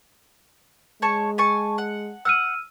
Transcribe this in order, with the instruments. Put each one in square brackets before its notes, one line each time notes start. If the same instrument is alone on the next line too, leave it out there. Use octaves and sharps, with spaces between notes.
[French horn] G#3 [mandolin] C#5 A5 C#6
[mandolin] G#5 A5 C#6
F#5
[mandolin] F#5 [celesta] E6 F6 D#7